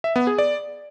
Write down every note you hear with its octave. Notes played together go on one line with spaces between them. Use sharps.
E5
B3
G#4
D5